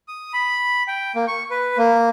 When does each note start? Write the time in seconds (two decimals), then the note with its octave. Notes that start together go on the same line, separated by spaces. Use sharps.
0.08 D#6
0.33 B5
0.88 G5
1.15 A#3
1.27 C#6
1.51 B4
1.78 A#3